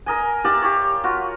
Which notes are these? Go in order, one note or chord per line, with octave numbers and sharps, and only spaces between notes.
A#4 D#5 G#5
G4 D5 E5 F5
G4 C#5
F4 F#4